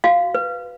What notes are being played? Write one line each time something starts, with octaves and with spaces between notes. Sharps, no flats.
F#4 F5
B4